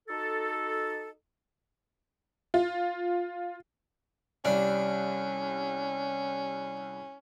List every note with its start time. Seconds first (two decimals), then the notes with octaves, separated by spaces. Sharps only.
0.08 D#4 F#4 A4
2.54 F4
4.45 C2 G3 C#4 D4